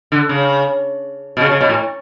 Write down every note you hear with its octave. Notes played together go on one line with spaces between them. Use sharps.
D3
C#3
B2
C#3
C#3
B2
A2